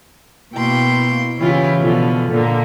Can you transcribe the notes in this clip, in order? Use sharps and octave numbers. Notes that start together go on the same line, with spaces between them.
B2 A#3 E4 G5 C6
C#3 E3 E4 F4 G4 G#4
B2 D3 F3
A#2 D3 A#3